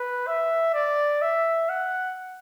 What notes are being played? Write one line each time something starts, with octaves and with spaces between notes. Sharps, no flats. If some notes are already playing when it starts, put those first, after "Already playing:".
Already playing: B4
E5
D5
E5
F#5